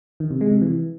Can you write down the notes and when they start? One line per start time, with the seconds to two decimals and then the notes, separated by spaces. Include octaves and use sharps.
0.20 D#3
0.31 C3
0.41 G#3
0.51 C3
0.62 E3